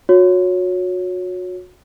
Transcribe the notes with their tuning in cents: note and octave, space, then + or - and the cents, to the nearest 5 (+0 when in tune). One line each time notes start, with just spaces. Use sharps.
F#4 -30 C#5 +0